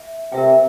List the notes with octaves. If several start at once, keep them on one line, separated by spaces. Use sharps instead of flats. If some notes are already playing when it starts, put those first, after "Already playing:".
Already playing: E5
C3 A#4 E5 G5